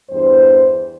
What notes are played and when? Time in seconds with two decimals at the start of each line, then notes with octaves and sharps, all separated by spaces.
0.10 E2 G2 C5